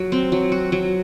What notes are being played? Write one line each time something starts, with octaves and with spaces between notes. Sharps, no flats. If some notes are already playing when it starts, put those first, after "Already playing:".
Already playing: F#3 F#4
C4
F#3
F#4
F#3